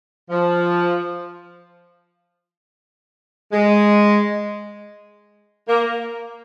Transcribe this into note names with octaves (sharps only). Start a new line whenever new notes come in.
F3
G#3
A#3